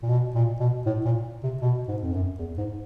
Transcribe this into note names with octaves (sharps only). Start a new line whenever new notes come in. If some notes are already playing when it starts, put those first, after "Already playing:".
A#2
B2
A#2
B2
A2
A#2
C3
B2
G#2
F2
F#2
E2
G#2